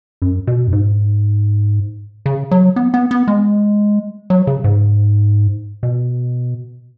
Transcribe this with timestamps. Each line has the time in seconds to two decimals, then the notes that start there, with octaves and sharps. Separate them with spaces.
0.22 F#2
0.47 B2
0.67 F#2
0.73 G#2
2.26 C#3
2.51 F#3
2.76 B3
2.94 B3
3.11 B3
3.28 G#3
4.30 F#3
4.47 C#3
4.64 G#2
5.83 B2